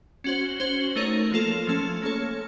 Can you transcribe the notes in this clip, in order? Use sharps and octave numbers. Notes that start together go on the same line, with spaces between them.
C#4 F#4 C5
C#4 F#4 C5
A3 D#4 A#4 C#5
F3 A#3 F4 A4
F3 A3 C#4 A4
A#3 C#4 A4 C#5